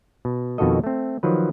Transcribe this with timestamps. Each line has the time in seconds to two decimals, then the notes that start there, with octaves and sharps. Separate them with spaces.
0.25 B2
0.58 F2 B2 D#3 F#4 A4 D#5
0.84 A3 C4
1.23 D#3 F3 F#3 B4